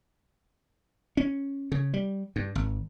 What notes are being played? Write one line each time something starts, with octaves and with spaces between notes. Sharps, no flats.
C#4
C#3
G3
G2
G#1